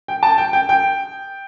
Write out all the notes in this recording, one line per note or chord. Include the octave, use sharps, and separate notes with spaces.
G5
A5
G5
G5
G5